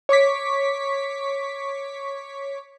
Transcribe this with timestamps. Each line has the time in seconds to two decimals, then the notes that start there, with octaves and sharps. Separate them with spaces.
0.09 C#5 C#6 D6 B6